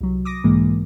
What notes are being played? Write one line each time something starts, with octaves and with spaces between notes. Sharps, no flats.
C2 F#3
D6 D#6 A#6
B1 G#2 E3 G#3 A#3